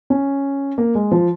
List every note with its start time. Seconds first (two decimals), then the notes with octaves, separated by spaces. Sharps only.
0.10 C#4
0.78 A#3
0.95 G#3
1.12 F3